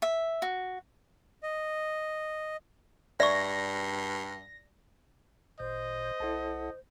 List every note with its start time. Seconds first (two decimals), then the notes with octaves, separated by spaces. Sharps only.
0.02 E5
0.42 F#4
1.43 D#5
3.20 G2 D5 E5 C#6 A#6
5.59 G#1 A#2 C5 D#5 G6
6.20 B1 E4 A4 F#5 A5